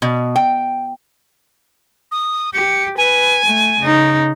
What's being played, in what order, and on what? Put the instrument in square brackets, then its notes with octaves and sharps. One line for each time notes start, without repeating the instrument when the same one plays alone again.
[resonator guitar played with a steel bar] B2
G5
[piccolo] D#6
[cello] G4 [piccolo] C#7
[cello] B4 [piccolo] G#5
[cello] A3
C#3 D#4